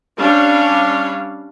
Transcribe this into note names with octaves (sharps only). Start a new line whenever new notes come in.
G3 C#4 D4 C#5 F5